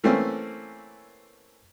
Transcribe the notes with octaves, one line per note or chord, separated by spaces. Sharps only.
E3 A3 A#3 C4 C#4